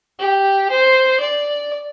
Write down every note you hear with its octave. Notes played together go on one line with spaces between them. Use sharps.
G4
C5
D5